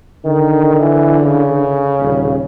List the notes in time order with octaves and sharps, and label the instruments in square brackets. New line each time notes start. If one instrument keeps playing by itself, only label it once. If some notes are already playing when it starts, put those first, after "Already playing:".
[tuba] D3 [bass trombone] D#3
[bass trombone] E3
C#3
[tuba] D#1